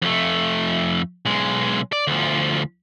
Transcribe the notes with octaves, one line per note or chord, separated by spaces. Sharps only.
F2 A3
B1 G#3
D5
D2 F3